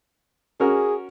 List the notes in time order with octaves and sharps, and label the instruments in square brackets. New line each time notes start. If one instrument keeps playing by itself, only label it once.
[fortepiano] C#4 F#4 A#4 [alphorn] G#4